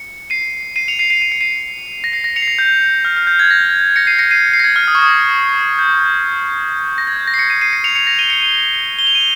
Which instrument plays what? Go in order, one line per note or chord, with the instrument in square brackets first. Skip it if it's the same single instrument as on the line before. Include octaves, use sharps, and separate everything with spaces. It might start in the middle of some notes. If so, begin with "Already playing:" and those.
Already playing: [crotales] C#7
C7 D#7
C7 D#7
C#7 F7
C7 D#7
C7 D#7
D#7
C#7
C7 D#7
A#6
C7
A#6
C#7 F7
C7
A#6
G6
F6
F6
G6
G#6
A#6
A#6 C#7
C7 D#7
A#6 C#7
C7 D#7
C7
A#6
G#6
F6
D#6
C#6
D#6
G6
A#6
G#6
G6
A#6
C7
A#6 C#7
C7 D#7
C7 D#7
A#6 C#7
C#7 F7
C#7 F7
A#6
D#7 G7
C#7 F7
D#7 G7
G7
F7
D#7